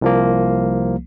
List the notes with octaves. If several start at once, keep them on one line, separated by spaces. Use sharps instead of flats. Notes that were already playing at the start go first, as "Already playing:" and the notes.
C2 F3 A#3